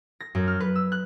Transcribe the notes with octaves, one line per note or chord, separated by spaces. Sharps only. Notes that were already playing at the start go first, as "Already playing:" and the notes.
A#6
F#2
F6
B4
E6
F#6